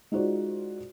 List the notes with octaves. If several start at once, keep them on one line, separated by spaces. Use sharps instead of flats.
G#3 D#4 F4 F#4 C5 D5